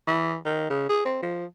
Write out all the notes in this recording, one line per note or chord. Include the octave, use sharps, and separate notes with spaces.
E3
D#3
C#3
G#4
C4
F3